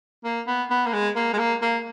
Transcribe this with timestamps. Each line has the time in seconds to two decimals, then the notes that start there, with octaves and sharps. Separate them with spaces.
0.24 A#3
0.47 B3
0.70 B3
0.86 A#3
0.93 G#3
1.16 A#3
1.33 G#3
1.39 A#3
1.62 A#3